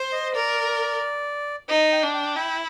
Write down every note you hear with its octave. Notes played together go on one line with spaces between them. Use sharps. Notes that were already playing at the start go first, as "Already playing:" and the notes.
Already playing: C5
D#5
A#4 D5
D#4 D#5
G5
D4
G5
E4 G5